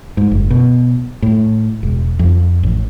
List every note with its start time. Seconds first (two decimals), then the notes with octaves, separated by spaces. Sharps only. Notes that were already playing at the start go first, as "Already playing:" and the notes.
0.17 G#2
0.31 F#1
0.50 B2
1.22 A2
1.83 E1
2.19 F2
2.63 A1